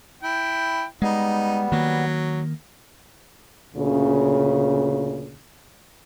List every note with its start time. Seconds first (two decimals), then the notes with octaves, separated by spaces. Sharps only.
0.23 E4 G5
1.02 G3 G#3 B3 D#4
1.72 D#3 F#3 A#3
3.75 D2 A#2 C#3